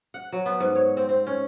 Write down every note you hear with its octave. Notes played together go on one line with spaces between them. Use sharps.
F#5
F#3
B3
G#2
C#5
C4
C4
C#4